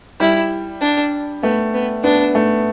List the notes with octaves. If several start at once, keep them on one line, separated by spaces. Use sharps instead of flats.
G3 E4
D4
A3 B3
B3
B3 D4
A3